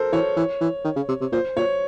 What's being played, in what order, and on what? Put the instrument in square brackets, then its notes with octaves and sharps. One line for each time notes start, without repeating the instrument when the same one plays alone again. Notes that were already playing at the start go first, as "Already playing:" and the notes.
Already playing: [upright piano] A4 A#4 C5
[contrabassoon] E3 [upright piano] C#5
[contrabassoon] E3
E3
D#3
C#3
C3
C3
[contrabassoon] A#2 [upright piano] C5
[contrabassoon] A#2 [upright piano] C#5